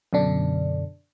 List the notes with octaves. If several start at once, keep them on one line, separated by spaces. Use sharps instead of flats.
F#2 B2 D3 D4